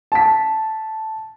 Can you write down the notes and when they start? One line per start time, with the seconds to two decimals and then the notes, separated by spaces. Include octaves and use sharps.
0.12 A5 B6